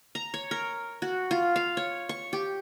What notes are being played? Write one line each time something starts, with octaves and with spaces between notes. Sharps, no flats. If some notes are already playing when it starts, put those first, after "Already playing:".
A#5
C#5
A#4
F#4
F4
F5
C#5
C#6
G4